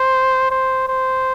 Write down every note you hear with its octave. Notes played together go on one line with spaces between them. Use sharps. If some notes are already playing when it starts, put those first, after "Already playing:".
Already playing: C5
C5
C5